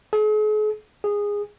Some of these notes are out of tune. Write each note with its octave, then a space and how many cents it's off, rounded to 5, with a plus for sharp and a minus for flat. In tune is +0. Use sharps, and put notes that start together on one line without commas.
G#4 +45
G#4 -15